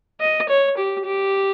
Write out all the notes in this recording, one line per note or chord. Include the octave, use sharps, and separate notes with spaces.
D#5
C#5
G4
G4